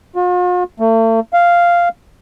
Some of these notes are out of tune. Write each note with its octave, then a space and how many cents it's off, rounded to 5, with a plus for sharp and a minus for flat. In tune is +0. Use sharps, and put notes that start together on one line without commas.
F4 +45
A3 +40
F5 -5